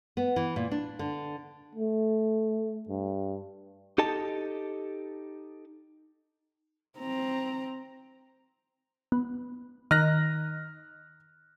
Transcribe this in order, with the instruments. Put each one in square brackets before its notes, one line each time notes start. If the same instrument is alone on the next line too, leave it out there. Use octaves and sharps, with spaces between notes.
[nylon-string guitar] B3
E3
A#2
D4
D3
[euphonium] A3
G2
[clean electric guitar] D#4 G4 A4 D#5 A5
[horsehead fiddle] C4 A#5
[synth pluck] B3
[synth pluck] D#3 [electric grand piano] F6 F#6 A#6